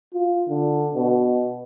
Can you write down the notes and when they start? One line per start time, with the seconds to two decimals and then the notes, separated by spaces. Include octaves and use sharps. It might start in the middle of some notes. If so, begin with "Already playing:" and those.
0.13 F4
0.49 D3
0.95 B2